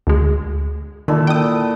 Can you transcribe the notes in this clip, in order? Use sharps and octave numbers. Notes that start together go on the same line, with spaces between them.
D2 G#3
A#2 D#3 E4 A4
D4 G5 D#6